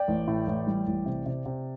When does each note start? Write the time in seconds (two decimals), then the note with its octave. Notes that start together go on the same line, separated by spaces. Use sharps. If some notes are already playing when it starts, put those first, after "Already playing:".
Already playing: D5 G5
0.08 A1
0.28 A2
0.47 A1
0.67 G3
0.87 A1
1.06 C3
1.26 C3
1.46 C3